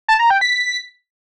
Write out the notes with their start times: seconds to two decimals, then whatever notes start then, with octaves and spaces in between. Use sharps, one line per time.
0.08 A5
0.19 A#5
0.30 G5
0.41 B6